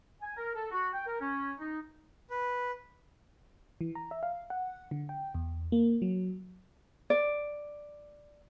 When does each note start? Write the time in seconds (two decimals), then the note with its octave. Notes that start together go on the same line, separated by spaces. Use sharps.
0.21 G#5
0.36 A#4
0.54 A4
0.71 F#4
0.93 G5
1.06 A#4
1.19 C#4
1.59 D#4
2.31 B4
3.81 E3
3.95 A#5
4.11 E5
4.23 F5
4.50 F#5
4.91 D3
5.09 G5
5.34 E2
5.72 A#3
6.02 F#3
7.10 D5